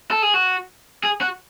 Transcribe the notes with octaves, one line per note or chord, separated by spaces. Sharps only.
A4
G#4
F#4
G#4
F#4